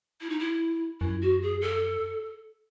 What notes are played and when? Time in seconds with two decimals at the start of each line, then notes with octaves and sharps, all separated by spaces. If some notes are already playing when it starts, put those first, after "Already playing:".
0.21 E4
0.29 D#4
0.39 E4
1.01 F#2 E4
1.21 F#4
1.42 G#4
1.61 A4